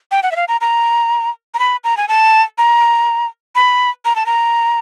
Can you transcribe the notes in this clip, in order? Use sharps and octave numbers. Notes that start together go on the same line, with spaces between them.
G5
F#5
E5
F5
A#5
A#5
A#5
B5
A#5
G#5
A5
A#5
B5
A#5
A5
A#5